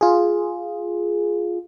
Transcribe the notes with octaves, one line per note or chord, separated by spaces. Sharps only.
F4 G#4